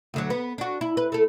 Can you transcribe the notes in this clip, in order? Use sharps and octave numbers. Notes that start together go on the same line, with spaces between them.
D2 D3 F#3
B3
D4 F#4
E4
B4
A3 A4